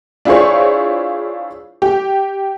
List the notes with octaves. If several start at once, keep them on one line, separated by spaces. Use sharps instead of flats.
D4 E4 F4 G#4 C5 C#5
G4